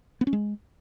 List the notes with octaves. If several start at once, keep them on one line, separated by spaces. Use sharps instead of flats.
B3
C#4
G#3